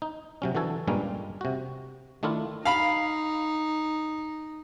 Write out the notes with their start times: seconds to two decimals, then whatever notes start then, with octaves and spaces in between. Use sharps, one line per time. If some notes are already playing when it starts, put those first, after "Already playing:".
0.02 D#4
0.42 C3 F#3 C#4
0.55 D3 E3 F#4 A4 G#5
0.87 G2 A#2 G3 G#3 A#3 C#4
1.41 C3 F#4
2.23 D#3 A3 D4 E4 F4
2.65 D#4 F5 B5